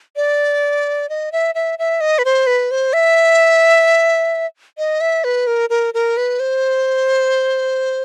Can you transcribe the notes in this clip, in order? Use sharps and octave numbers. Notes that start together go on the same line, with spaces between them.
D5
D#5
E5
E5
E5
D#5
B4
C5
B4
C5
E5
D#5
E5
B4
A#4
A#4
A#4
B4
C5